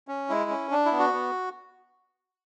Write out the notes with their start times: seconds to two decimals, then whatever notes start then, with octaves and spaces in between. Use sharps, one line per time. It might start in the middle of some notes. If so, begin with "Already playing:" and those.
0.08 C#4
0.29 G#3 E4
0.50 C#4
0.71 D4
0.85 E4
0.92 B3
0.99 F#4
1.13 B3